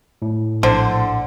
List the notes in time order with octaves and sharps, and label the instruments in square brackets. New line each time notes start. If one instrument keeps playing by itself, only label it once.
[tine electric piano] A2
[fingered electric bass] A#1 [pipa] D3 [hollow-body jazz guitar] C5